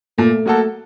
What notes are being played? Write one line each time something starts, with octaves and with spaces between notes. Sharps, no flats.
A#2 A3
F#3 A#3 F#4 A4